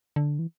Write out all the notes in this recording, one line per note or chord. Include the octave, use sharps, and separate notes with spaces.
D3
E3